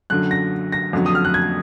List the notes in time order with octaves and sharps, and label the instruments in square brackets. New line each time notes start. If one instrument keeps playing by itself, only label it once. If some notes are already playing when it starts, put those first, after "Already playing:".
[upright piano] F#2 D3 F#3 F#6
A#6
A#6
F2 D3 F#3
D#6
F6
F#6
G#6